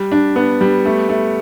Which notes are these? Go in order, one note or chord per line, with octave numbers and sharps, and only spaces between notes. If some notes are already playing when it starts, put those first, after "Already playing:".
Already playing: G3
D4
B3
G3
A3
A3